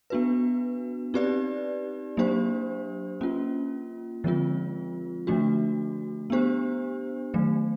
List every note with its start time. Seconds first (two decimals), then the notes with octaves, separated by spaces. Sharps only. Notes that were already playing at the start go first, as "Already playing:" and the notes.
0.10 B3 D4 F#4 B4
1.14 C4 D#4 G4 B4 D5
2.17 F#3 A#3 D4 G4 C5
3.21 A#3 C#4 F4
4.24 D3 F3 G#3 C4 F4
5.27 D3 F3 A3 D4 F#4
6.30 B3 D4 G4 C5
7.34 D#3 F#3 A3